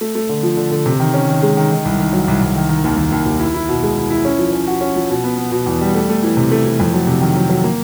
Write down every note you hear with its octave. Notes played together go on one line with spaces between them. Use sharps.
A3
A3
D3
F3
D3
D3
C3
D#3
C#4
D#3
G#3
D#3
D#3
C2
D#3
F#3
C2
C2
D#3
D#3
D#2
D#2
D#2
D#2
E4
E4
B2
G#3
E4
E4
C#4
F3
C#4
F#4
C#4
F3
B2
B3
B3
B2
E2
G3
A3
A3
E3
C3
A3
E3
F2
F#3
C3
D#3
F#3
F#3
A#3